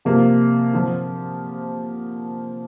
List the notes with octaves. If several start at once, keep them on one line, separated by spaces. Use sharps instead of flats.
C3 F3 A#3 F4
D3 F3 C4 F4